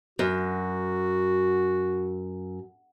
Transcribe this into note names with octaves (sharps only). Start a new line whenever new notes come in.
F#2 F#4